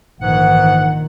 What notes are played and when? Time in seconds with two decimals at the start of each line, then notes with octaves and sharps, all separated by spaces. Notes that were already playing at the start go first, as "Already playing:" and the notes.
0.21 A#1 G#2 D#3 E3 F#5